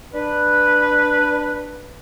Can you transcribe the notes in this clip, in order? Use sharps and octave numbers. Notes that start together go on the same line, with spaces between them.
D4 B4